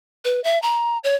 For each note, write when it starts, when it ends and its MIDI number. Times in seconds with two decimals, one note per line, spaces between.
0.25 0.42 71
0.44 0.60 76
0.62 0.98 82
1.04 1.15 73